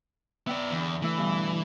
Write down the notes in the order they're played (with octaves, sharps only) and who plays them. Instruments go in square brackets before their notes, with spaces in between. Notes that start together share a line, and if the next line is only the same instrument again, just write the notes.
[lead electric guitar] B3 D5 [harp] E5 G5
[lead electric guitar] E2 [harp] D3
[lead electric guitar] E3 [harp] A3 E5
[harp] G2 B2 D3